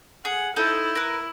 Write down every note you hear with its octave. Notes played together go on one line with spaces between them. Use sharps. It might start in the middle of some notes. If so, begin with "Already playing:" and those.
G#4 F#5
D#4 E4 A4 C5
A#4 B4